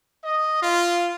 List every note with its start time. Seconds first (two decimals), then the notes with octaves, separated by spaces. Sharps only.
0.23 D#5
0.61 F4